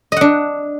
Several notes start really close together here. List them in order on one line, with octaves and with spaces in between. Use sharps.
D#5 F#5 D4